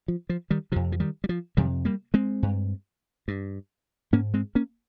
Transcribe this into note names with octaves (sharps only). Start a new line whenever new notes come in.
F3
F3
D#3 G3
F2 C3 F3
F3
D#3 G3
G3
F3
F2 C3 D#3 G3
G3 A#3
G#3 C4
G2
G2
G#2 A#3 C#4
G#3 C4
A#3 C#4